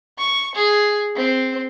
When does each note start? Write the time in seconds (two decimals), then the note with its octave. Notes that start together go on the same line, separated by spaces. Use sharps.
0.18 C#6
0.55 G#4
1.16 C4